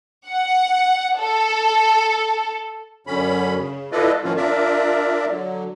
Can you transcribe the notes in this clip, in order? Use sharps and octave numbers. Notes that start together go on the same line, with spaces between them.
F#5
A4
F#2 D3 C#4 B5
C#3
E4 F4 A4 B4 D5 D#5
A2 D#3 F3 A#3 C#4 F4
D4 F4 A#4 D5 E5
D3 F#3